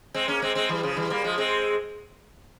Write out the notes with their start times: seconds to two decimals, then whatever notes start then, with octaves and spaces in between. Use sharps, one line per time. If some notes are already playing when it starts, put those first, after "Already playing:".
0.14 G#3 C4
0.28 A#3 C#4
0.42 G#3 C4
0.55 G#3 C4
0.69 E3 G3
0.83 C#3 F3
0.97 E3 G3
1.10 G3 A#3
1.24 F3 G#3
1.38 G#3 C4